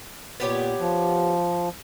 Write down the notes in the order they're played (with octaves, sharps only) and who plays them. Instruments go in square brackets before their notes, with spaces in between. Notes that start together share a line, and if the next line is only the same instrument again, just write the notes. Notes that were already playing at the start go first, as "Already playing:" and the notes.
[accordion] A#2 [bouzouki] B3 G4 C#5
[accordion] F3